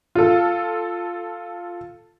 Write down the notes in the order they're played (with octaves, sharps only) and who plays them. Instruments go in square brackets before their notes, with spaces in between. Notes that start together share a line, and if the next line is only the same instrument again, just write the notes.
[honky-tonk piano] F4 A4